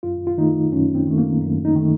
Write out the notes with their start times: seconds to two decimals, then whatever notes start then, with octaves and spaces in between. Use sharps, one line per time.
0.03 F#2 F4
0.27 F4
0.37 D#3 A3 D#4
0.72 F#2 C#4
0.95 C4
1.07 D#3 A3
1.18 A#3
1.42 F#2
1.65 D#4
1.76 D#3 A3